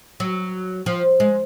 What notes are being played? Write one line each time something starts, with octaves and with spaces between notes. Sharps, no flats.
F#3
F3
G#3